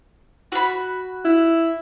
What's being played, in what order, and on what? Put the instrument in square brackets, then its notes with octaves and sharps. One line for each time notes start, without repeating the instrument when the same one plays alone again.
[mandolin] F#4 B5
[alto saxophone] E4